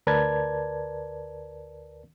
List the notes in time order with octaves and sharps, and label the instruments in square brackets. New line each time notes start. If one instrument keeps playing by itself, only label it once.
[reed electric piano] D2 A#4 B4 D5 A5 G#6